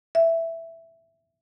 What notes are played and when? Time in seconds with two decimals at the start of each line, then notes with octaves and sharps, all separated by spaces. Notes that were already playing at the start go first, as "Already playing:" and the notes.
0.15 E5